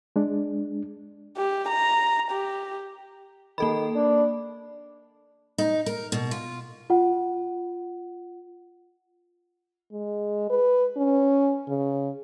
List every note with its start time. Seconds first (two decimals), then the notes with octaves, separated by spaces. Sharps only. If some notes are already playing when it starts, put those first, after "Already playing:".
0.16 G#3 D4
1.37 G4
1.69 A#5
2.31 G4
3.58 D#3 A#3 A4 B5
3.95 D4
5.58 D#4
5.86 A#4
6.12 B2
6.31 F4
6.90 F4 F#5
9.92 G#3
10.50 B4
10.96 C#4
11.69 C#3